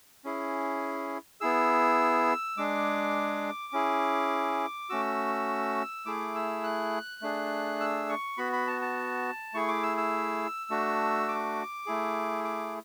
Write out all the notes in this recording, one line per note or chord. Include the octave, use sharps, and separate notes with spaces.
C#4 E4 G#4
B3 E4 G#4 E6
G#3 D4 G#4 D6
C#4 E4 G#4
A3 C#4 F#4 E6
A3 E4 G#4 D6
E6
F#6
A3 D4 G#4
E6
C#6
B3 F#4 B5
B5
A5
A5
A3 E4 G#4 C#6
D6
E6
E6
A3 D4 F#4
D6
A3 E4 G#4
D6